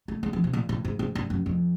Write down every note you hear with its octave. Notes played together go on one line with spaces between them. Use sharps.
A3
G#3
E3
C3
A#2
A2
G#2
G#2
G2
F#2
F2